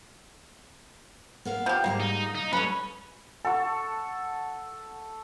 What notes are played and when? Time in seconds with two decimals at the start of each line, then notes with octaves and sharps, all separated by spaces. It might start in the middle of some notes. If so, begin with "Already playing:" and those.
1.45 B3 A#4 F5
1.66 F3 G4
1.84 G#2 G3 A#3 A#4
2.00 D#4
2.35 D#4
2.53 G3 A3 C#4 B4
3.45 A4 F#5 C#6